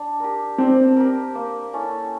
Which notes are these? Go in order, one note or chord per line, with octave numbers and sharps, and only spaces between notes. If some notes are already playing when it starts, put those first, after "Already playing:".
Already playing: D4
G4 A#4
C4 D4
G4 A#4
A#3
C#4 E4 A4